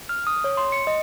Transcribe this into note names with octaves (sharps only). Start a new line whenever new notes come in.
F6
D#6
C#5
C6
C#7
D#5